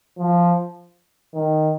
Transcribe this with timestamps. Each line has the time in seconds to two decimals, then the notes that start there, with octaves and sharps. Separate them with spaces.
0.18 F3
1.34 D#3